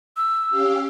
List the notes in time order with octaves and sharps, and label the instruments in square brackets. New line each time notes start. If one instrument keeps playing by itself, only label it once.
[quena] E6
[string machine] C#4 G4 F5